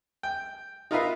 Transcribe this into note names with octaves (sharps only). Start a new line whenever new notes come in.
G5
D#4 F4 A#4 B4 E5 F5